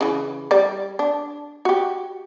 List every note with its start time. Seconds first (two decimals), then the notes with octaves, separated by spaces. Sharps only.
0.01 C#3 E3
0.51 G3 D5
0.99 D4
1.65 F#4 G4